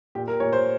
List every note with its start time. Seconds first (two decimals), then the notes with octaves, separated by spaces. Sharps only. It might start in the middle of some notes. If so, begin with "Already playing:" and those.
0.15 A#2 G4
0.28 A#4
0.40 A#2 C#5
0.53 C5